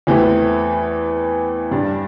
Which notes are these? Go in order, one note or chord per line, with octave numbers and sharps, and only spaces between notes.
E2 E3 A3 C4 G4
G2 G3 D4